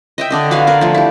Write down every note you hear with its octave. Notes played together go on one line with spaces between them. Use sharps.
D#5 E5 G5
D3 D4 D#5
F#4 B4 F5 G#5
A#4 D5
F3 A3
E4 G4